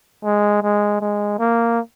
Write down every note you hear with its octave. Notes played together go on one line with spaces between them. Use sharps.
G#3
G#3
G#3
A#3